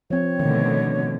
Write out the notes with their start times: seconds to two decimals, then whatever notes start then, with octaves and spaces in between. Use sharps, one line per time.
0.10 F3 C4 C#5
0.39 B2 D3 D#3 A3